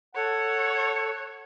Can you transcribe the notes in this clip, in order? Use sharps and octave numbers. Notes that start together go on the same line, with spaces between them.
A4 C#5 F#5